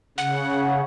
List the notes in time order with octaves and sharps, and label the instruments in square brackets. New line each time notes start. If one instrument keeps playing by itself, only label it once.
[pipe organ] C#3 [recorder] F#5